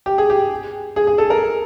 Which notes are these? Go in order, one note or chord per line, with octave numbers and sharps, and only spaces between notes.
G4
G#4
G4
G#4
G#4
A4
A#4